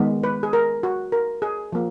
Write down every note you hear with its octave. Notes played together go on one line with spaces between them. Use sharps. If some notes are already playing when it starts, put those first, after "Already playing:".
Already playing: D#3 G#3 B3
B4
G#4
A#4
F#4
A#4
G#4
F3 A#3